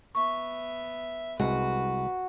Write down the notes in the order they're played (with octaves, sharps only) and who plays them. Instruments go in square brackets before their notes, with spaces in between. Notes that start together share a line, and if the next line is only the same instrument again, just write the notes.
[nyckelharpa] B3 E5 [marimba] C#6
[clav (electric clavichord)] C2 G#3 [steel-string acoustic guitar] F#4 [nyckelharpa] B4